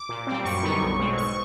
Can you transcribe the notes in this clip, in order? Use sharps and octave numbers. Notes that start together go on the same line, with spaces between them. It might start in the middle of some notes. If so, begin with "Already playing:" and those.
Already playing: D6
A#2
G3 C4
F#2 C#6
D3 G3 B3 D#4
B1
B2 G#3 C4
G#2 C#6